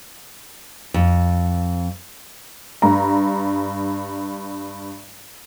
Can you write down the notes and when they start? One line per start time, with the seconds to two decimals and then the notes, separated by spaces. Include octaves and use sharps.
0.94 F2
2.82 G2 A#5